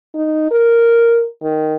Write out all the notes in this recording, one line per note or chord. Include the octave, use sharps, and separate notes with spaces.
D#4
A#4
D#3